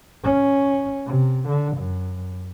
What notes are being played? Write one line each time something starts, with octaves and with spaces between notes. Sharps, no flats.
C#4
C3
D3
F#2